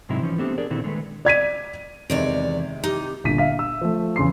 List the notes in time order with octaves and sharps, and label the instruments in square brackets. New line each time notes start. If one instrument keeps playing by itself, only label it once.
[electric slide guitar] G#2 C3 F#3 C4 D#4 E4
E3 F3 C#4 D#4
A3 B3 C4 D4 G4
D4 G#4 A#4 D5
A#2 D3 D#3 C4 E4
D3 D#3 G#3 A3 B4
[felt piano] D5 G#6 B6 D#7
[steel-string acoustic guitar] E2 C#5 D5 [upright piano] C3 D#3 G#3
[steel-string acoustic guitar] D#4 [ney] G4
[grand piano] G1 A#2 D3 B6 D#7
E5 F5 B6
E6
F3 A3
E2 C#3 C6 C7